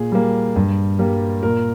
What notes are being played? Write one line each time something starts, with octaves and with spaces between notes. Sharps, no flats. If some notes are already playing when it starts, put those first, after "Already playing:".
Already playing: A#2 G#4
G3 A#3
G2
G3 A#3
A#2 A#4